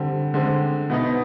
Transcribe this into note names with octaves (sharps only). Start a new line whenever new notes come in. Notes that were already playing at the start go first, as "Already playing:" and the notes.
Already playing: D3 G3 C4
D3 G#3 C4
B2 B3 D#4